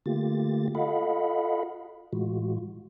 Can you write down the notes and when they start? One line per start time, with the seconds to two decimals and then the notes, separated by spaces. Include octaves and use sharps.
0.06 D3 A3 A#3 F4 G4 A6
0.75 F4 A4 D#5 F5 F#5 B5
2.13 A2 E3 G#3 F4 F#4